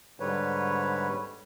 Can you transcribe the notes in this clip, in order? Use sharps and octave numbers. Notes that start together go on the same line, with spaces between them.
G#2 D3 G3 B4 C#5